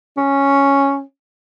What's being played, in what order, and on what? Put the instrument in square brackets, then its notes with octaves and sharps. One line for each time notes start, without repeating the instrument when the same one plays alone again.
[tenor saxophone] C#4